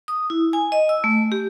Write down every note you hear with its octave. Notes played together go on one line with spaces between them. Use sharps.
D#6
E4
G#5
D#5
E6
A3
G4